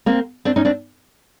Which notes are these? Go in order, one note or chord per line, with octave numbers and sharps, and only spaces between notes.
A#3 C4
C4 D4
C#4 D#4
C4 D4